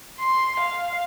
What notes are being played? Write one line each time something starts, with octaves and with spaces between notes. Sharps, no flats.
C6
F5